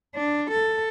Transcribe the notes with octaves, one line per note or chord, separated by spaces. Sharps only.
D4
A4